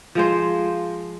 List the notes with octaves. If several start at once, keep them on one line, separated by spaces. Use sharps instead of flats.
F3 G#3 C5